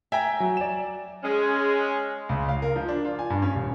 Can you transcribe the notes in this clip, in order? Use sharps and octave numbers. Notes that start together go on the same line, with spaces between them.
E5 G5 G#5 A#5
F#3
D5 E7
G#3 C#4
C#2
F5
A#4
F3
D4
F4
G#5
G2
C#4
D#1